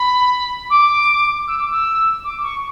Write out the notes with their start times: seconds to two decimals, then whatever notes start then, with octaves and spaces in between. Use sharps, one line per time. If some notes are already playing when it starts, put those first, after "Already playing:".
Already playing: B5
0.70 D6
1.47 E6
1.58 D6
1.70 E6
2.23 D6
2.42 C#6